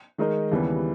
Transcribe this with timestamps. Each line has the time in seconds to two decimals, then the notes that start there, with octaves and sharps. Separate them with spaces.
0.18 D#3 G#3 D#4 A#4 D#5
0.51 D#2 C#3 E3 G3 B3